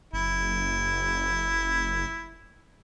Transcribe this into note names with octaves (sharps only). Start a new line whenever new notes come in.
F#1 E4